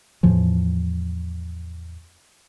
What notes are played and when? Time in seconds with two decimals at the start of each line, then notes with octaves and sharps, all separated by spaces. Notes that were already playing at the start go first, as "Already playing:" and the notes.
0.23 E2 A2 E3 F3